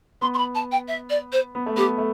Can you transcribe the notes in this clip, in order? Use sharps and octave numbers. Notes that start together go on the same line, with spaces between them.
B3 C6
C6
B5
A5
G5
E5
D5
C5
B3
A3
B3 G4
A3